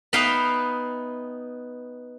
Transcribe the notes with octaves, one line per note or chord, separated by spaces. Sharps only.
B3 D#4 B4 E5 F5 G5